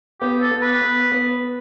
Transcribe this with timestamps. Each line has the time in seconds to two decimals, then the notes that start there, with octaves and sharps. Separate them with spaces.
0.21 B3 G4
0.41 A4
0.51 B3
0.62 B4
0.81 B3
1.12 B3